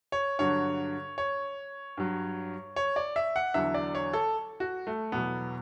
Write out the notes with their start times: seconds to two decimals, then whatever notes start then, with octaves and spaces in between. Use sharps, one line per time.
0.12 C#5
0.39 G2 D3 F#3 C#5
1.18 C#5
1.97 G2 F#3
2.76 C#5
2.96 D5
3.16 E5
3.36 F#5
3.54 E2 D3 F#3 E5
3.74 D5
3.95 C#5
4.13 A4
4.60 F#4
4.87 A3
5.12 E2 B2 F#3 B3